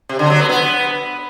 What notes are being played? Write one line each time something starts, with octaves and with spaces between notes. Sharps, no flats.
C3
D3
F#3
B3
B3